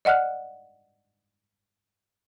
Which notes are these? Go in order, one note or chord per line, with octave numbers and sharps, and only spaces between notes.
D5 D#5 F#5 F6 F#6